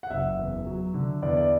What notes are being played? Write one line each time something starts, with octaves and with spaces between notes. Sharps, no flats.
F#5
F#1 E5
E2
F#3
D3
E2 D5
D5